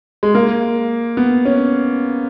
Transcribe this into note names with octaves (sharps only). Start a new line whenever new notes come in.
G#3
A#3
B3
C#4